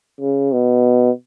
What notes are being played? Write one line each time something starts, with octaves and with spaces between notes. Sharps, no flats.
C#3
B2